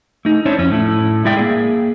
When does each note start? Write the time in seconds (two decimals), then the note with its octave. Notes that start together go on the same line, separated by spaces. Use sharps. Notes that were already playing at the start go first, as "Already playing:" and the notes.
0.25 A3 D#4
0.45 C#4 D4 E4 C5 C#5
0.58 F2 C#4
0.70 A2 A3 E4
1.25 G#3 E4 D5 E5 G5
1.37 A#3 B3 G#4